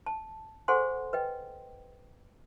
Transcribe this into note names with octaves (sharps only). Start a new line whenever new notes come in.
A5
G#4 A4 C5 F#5 G#5 C6
B4 D#5 G5